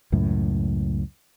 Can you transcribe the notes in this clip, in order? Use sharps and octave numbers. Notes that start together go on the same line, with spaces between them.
C#2 F#2 A2